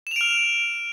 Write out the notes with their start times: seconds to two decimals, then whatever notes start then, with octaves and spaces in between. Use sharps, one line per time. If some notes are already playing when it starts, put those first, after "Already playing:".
0.07 E7
0.11 F7
0.16 D7
0.21 F6